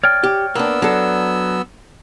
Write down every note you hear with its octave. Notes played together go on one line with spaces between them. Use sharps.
C#5 D5 G5 F6
G4
A#3 B3 D4 E6
F#3 D4 A4